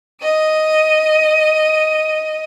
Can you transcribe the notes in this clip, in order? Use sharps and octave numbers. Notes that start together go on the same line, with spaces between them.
D#5 D#7